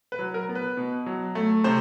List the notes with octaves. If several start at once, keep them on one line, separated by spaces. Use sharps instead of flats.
B4
F#3
A#4
B3
B4
B2
F#3
A3
C3 C5